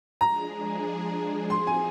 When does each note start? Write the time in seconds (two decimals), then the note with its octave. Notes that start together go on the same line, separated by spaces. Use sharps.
0.21 F3 G#3 D4 G#4 A#5
1.50 F3 C4 D#4 G#4 C6
1.67 G#5